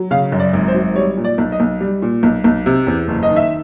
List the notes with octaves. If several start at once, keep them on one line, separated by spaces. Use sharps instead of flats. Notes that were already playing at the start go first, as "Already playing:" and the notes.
Already playing: F#3
C#3 F5
F#2
D5
G#1
C5
F#3
G3 C#5
A#2
D5
B1
D#5
B1
G3
A#2
B1
B1
C3
E2
F#1
D#5
D#3
E5